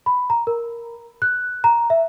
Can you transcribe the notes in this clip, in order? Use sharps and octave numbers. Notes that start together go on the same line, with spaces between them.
B5
A#5
A#4
F#6
A#5
E5